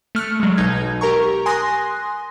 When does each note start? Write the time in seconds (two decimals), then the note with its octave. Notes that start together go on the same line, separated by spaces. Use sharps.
0.15 A3 F6 F#6 C#7
0.40 F#3 G#3
0.57 B1 B2 D#4 G#6
1.01 G4 A#4 A#5 C#6
1.46 G#5 C6 D#6 F#6 A#6